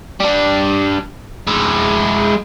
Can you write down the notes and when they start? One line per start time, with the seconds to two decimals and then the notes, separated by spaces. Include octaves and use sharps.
0.20 G3 D4
1.47 G#3 E4